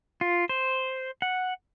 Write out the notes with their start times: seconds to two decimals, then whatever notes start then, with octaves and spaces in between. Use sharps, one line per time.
0.21 F4
0.49 C5
1.22 F#5